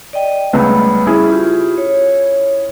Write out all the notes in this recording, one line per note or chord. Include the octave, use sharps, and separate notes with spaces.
D5 D#5 G5
C#2 G3 A3 B3 B5
C#4 E4 G#4
F4 G4
C#5